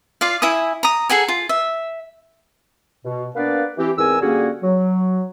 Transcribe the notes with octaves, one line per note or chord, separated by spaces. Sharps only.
F4 D5 F5
E4 E5 G#5 D#6
A#5 D#6
G#4 A4 F#5 G#5
F4
E5
B2
A#3 B3 D4 B4 D5 F5
E3 C4 G4
E2 G#2 C4 A#4 G#5 E6
D3 G3 A#3 C#4 F#4 G#4
F#3